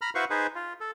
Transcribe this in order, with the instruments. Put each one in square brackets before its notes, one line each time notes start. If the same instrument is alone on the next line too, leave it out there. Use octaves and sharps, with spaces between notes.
[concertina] A#5 B5 F6
E4 F#4 B4 C5 F5 C#6
D#4 G#4 B4 C5
F4
A4